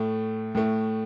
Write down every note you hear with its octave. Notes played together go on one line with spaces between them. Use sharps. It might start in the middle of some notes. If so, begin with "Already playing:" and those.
Already playing: A2 A3
A2 A3